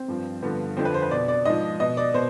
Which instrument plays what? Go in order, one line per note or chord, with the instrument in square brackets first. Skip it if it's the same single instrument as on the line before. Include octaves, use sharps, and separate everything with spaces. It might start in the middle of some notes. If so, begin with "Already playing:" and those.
Already playing: [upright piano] C4
G2 F3
G2 D3 F3 B3
F2 D3 F3 C4
B4
C5
B4
B2 D5
D5
G#2 F3 D#5
B2 D#5
D5
B2 C5